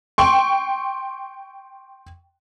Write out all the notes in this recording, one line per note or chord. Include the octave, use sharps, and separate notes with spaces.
G5 C6 C#6